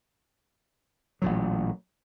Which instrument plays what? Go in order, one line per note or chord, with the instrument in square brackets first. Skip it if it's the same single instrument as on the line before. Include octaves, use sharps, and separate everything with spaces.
[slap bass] A1 A#2 F#3